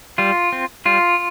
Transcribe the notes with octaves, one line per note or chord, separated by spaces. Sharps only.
G3 F4
C4
G3 F4